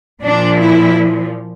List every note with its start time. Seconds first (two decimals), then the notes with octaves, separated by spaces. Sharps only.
0.21 A#2 F3 D4
0.59 E4